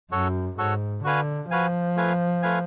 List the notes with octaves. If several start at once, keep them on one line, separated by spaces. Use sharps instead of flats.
F#2 F#4 A4 C#5
G#2 F#4 A4 C#5
D3 F#4 B4 F5 G#5
F3 F#4 B4 F5 G#5
A3 F4 B4 F5 G#5
A3 F4 B4 F5 G#5